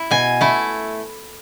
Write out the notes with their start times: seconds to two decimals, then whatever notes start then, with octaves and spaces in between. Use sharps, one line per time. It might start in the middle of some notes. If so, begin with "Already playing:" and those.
Already playing: E4
0.11 B2 G#5
0.41 A3 E4